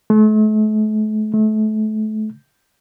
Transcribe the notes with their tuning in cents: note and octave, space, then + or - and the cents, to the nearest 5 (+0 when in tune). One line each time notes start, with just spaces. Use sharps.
A3 -40
A3 -30